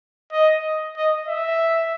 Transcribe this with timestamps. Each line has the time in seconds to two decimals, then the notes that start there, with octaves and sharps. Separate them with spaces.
0.32 D#5
0.97 D#5
1.28 E5